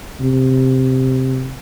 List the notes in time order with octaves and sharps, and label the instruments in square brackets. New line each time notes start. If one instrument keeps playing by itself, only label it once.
[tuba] C3